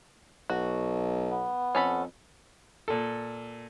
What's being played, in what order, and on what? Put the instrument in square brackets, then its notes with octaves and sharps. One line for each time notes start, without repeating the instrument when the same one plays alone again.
[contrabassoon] B1 [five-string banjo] F#4
[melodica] B3
[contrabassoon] F2 [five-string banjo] C#4 A4 B5
[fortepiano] A#2 A4